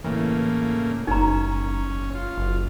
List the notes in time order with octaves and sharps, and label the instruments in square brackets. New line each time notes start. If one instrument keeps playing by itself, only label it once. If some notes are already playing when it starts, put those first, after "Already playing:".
[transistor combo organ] A2 C#3 A#3 [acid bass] E3
[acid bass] F#1 [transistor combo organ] C#4 [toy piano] D#4 A#5
[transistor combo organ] F4
[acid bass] F#1